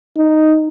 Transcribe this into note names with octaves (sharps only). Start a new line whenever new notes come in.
D#4